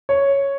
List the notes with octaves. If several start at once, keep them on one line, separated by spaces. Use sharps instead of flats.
C#5